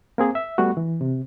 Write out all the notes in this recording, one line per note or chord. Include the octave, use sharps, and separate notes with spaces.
A#3 C4 G#4
E5
G3 A3 B3 F#4
E3
C3